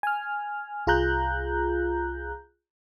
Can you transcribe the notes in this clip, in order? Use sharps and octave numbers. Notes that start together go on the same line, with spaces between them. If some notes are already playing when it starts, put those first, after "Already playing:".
G#5 F6
C2 F4 G#4 A#5 F#6 G6